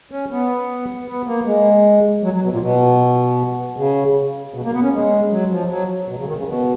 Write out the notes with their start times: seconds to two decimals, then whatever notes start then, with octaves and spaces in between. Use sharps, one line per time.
0.11 C#4
0.31 B3
1.08 B3
1.27 A#3
1.46 G#3
2.23 F#3
2.34 F#3
2.43 B2
2.52 A#2
2.61 B2
3.77 C#3
4.54 B2
4.65 A#3
4.73 B3
4.83 C#4
4.93 G#3
5.31 F#3
5.50 F3
5.70 F#3
6.08 B2
6.18 C#3
6.27 D#3
6.37 C#3
6.46 B2